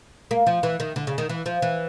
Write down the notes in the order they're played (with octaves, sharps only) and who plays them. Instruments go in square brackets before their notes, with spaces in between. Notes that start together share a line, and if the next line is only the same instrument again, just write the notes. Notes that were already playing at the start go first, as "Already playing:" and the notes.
[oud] A#3
F3
E3
D#3
D3
C#3
D#3
E3
F3
E3